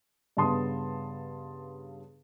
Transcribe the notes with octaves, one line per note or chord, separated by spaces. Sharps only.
G2 C#3 B3 A5 C6 D#6